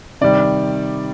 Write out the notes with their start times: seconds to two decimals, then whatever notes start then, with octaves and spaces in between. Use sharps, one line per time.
0.21 C3 D#3 G3 D5